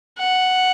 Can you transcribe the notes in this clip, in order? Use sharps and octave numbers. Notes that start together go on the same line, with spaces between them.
F#5